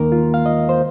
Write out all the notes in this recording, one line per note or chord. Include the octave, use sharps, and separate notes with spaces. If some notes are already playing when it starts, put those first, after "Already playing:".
Already playing: D#2 D#3 A#3 A#4
F4
F5
D#5
C5